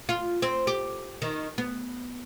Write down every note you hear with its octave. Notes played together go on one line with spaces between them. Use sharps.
F4
C4
G4
D#3
B3